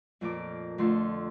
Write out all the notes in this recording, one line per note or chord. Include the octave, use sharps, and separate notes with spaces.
F2 A#2 A#3 A4 A#4 D6
F2 D3 A3 F4 C6 E6